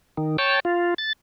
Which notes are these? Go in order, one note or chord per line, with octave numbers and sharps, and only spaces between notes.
D#3
C#5 G5 A5
F4
A6